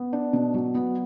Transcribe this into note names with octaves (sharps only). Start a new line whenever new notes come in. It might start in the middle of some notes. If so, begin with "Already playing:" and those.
Already playing: B3
D4
B2
F#3
B3